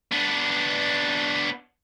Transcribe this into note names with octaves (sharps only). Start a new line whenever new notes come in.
B3 D4